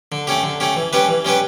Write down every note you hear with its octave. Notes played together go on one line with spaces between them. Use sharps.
D3
A3 C#4 G4
D3
A3 C#4 G4
E3
G3 C#4 G4 B4
E3
G3 C#4 G4 B4